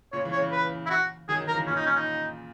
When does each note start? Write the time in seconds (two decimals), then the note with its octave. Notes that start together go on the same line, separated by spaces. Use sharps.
0.12 A#2 C#3 C#5
0.25 C#3 E3
0.32 C#5
0.39 C#3 E3
0.52 B4
0.86 E4
0.90 F#4
1.29 D#3 F#3 G#4
1.41 D#3 F#3
1.48 A#4
1.54 C#3 E3
1.66 A#2 C#3 C#4
1.76 D#4
1.86 C#4
1.96 D#4